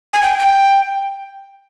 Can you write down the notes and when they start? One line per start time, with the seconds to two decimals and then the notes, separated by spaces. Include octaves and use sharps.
0.13 G#5
0.23 G5
0.39 G5